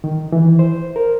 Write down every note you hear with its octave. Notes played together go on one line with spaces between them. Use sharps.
D#3
E3
C5
A#4